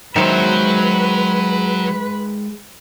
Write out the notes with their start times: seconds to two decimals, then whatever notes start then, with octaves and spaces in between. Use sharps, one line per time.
0.16 D#3 F#3 G#3 B4 C5 E5